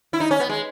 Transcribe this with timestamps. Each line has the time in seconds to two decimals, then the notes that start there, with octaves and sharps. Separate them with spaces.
0.13 E4
0.20 D#4
0.31 C#4
0.40 B3
0.49 G#3